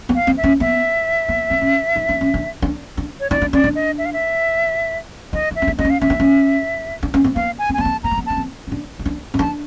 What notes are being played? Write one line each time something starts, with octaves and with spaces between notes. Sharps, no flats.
B3
F5
C4
E5
C#4
B3 E5
B3
C4
C#4
D#4
D4
C#4
D4
D4
D4
C#5
D#4 D5
D4
C#4 D5
D4
D#5
E5
F5
E5
D#4 D#5
D#4
E5
C#4
D4
D4 D#5
C#4
F5
C#4 E5
D4
C#4
D4
C#4
C4
B3 F5
G#5
C4
G#5
B3
C4 A5
B3 A#5
A#3
B3
C#4 A5
C4
C#4
D4
D#4
D4
C#4
D4 A5